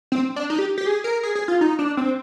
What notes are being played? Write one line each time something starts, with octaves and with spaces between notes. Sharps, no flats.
C4
D4
D#4
G4
G4
G#4
A#4
G#4
G#4
F4
D#4
D4
C4